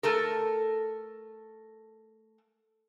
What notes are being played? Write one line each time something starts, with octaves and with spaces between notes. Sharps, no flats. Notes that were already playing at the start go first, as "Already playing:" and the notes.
A3 A4 A#4